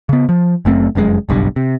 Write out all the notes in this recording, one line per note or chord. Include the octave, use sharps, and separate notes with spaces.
C#3 B3
F3
F#1 F#2 A3 C4
F1 F#2 C3 G#3
F#1 B1 G2
C3